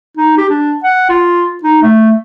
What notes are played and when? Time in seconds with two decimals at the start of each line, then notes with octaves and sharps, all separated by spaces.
0.17 D#4
0.38 G4
0.49 D4
0.84 F#5
1.09 F4
1.63 D#4
1.82 A3